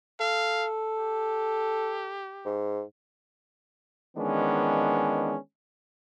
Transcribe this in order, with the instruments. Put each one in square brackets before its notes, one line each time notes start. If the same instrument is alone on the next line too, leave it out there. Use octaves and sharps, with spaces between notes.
[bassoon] A4 [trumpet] F5
[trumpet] G4
[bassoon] G#2
[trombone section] D#3 E3 G#3 B3 C#4 D4